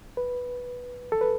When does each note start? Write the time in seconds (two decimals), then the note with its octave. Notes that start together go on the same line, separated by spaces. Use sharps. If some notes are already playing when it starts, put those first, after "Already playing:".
0.17 B4
1.12 A4
1.21 B4